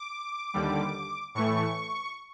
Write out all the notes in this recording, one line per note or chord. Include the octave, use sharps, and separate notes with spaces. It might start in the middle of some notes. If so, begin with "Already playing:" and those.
Already playing: D6
D#2 D3 G3
A2 E3 A3 C#6